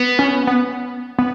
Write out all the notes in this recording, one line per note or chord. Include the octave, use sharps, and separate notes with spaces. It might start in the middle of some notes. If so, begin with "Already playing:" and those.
Already playing: B3
C#4
B3
B3